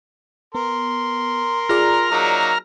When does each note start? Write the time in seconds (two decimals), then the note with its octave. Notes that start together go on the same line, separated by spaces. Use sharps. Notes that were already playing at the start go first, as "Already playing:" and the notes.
0.55 B3 A#4 C6
1.69 F4 G#4 D5 A#5 F6
2.11 F#3 A#3 D#4